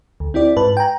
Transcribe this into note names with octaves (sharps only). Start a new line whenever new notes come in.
D2
C4 E4 G4 D5
G#2 B4 A5
G5 G#5 A#5